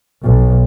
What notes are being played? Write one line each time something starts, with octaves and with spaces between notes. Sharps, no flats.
B1